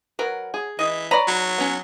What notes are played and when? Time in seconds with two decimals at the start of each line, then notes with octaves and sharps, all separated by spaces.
0.19 F#3 A#4 B4
0.54 G#4
0.79 E3 D#5
1.11 B4 C#5 D5 A#5 B5
1.27 F#3
1.58 B3 C#4